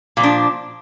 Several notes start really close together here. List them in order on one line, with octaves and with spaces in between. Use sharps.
A#2 F3 D4